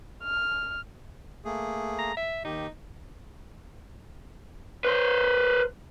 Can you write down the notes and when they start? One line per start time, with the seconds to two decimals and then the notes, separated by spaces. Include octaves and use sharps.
0.23 F6
1.45 A3 A#3 G#4
1.99 A#5
2.17 E5
2.45 D#2 D#3 D#4 G4
4.85 B4 C5